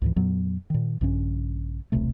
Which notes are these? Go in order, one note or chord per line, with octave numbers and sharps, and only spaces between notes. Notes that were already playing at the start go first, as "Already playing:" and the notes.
C#2 G#2 E3
F2 A#2 F#3 B3
A#2 D#3
A#1 G2 C#3 C#4
D#1 B1 C3 A3